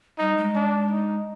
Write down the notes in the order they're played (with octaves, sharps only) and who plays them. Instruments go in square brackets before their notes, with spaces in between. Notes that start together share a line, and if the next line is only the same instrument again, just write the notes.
[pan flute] G3 [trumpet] D#4
[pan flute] G#3
[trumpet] D4
D#4